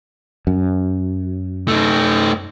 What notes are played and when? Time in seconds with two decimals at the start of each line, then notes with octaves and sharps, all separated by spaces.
0.47 F#2
1.68 A3 D#4